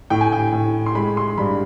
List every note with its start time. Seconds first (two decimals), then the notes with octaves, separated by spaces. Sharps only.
0.10 A2 G5
0.21 G#5
0.32 G5
0.52 A2
0.86 C6
0.95 G#3 B5
1.17 C6
1.38 G2 B5